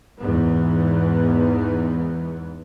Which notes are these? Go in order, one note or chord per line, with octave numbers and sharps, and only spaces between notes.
E2 G#2 B3